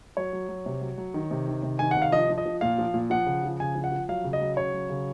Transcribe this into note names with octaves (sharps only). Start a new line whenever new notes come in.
F#3 C#5
F#3
F#3
C3
F#3
F#3
D#3
C3
D#3
C3
D#3 G#5
F#5
C3
F5
F3 D#5
F3
D#5
F3
A#2 F5
F3
A#2
F3 F#5
C#3
F3
C#3 G#5
F3
F#5
F3
F#3 F5
C#3
D#5
F#3
C#3 C#5
F#3
C#3